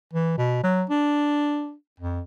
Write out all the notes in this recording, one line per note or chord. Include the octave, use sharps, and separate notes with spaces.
E3
B2
F#3
D4
F2